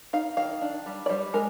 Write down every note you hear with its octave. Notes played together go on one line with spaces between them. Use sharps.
D#4 F5
D#3 F5
D4
G3
D5
G3 C5
G#3 A#4